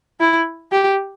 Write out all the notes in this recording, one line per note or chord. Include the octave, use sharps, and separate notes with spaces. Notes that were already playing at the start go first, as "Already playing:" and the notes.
E4
G4